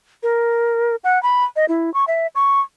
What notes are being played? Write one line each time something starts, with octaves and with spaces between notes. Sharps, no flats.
A#4
F#5
B5
D#5
E4
C#6
E5
C#6